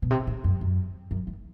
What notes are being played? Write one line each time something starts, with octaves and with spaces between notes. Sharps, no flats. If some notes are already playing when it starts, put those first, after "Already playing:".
B2
C3
A2
F#2
F#2
F#2
E2